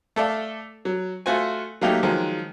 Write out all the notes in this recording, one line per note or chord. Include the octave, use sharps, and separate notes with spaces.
A3 A4 D5 F5
F#3
A3 F4 F#4 C5 G#5
F#3 A3 A#3 D#4 G4
D#3 F3 F#3 G#3